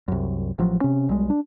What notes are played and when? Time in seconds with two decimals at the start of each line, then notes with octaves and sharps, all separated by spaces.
0.08 C2 F#2
0.58 A1 F3 F#3
0.81 C3 C#4
1.09 B1 G3 G#3
1.30 D4